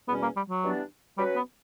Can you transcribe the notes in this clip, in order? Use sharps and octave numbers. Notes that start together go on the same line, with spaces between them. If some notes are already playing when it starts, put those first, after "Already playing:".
E2 B2 G3 B3 C#4
A#3
G3
F#3
E3 G3 B3 D4
F#3 G3 C#4 F#4 B4
B3